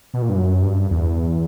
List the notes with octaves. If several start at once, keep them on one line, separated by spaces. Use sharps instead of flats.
B2
A#2
G2
F#2
G2
E2